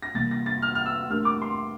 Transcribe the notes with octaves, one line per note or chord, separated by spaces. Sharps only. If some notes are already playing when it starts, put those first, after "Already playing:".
A#6
C3 E3 G3 A#3 A6
A#6
A6
F6
F6
E6
A3 D4 G4 A#4 F6
D6
C6